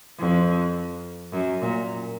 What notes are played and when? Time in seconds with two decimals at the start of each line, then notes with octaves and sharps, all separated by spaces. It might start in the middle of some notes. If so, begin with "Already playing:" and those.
0.19 F2
1.33 F#2
1.62 A#2